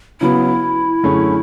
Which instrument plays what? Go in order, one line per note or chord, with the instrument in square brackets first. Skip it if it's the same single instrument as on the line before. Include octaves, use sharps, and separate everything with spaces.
[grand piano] C#3 F#3 B3 [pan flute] E4
[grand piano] F#2 D3 A3 C#4 G#4